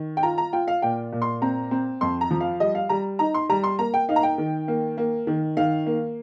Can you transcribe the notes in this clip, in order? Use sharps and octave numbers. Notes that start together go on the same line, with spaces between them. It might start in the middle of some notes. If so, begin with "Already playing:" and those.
Already playing: D#3
G5
F4 A#5
A#5
F4 G5
F5
A#2 G5
A#2
C6
C4 A#5
C4
F2 C6
A#5
F3
F5
G3 D#5
F5
G3 A#5
D#4 A#5
C6
G3 A#5
C6
A#3 A#5
G5
D#4 F5
A#5
G5
D#3
A#3
A#3
D#3
D#3 F5
A#3